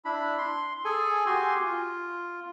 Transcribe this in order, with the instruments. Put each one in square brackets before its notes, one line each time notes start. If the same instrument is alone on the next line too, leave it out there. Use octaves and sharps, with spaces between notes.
[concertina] D4 E4 B5
C6
G#4 A4 G#5
F#4 G4 G#5 C6
F4